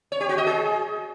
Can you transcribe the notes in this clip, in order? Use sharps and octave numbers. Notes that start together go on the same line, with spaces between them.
C#5
G4
F#4
D#5
G#4